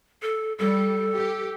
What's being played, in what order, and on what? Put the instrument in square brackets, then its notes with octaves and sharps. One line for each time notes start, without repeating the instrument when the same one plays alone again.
[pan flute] A4
[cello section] G3 [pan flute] A4
[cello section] G4